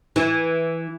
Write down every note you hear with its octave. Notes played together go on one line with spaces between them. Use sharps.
E3